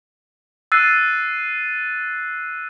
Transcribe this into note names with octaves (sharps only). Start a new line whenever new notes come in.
E6 F#6 A6 C7 D#7